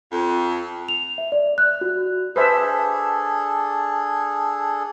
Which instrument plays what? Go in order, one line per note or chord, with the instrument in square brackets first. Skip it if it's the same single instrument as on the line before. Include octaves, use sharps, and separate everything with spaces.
[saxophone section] F2
[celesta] F7
E5
D5
F#6
F#4
[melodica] D4 G#4 A4 [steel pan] B4 C5 E5